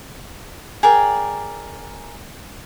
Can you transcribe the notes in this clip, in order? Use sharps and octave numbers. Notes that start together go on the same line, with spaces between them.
G#4 A#4 D5 G5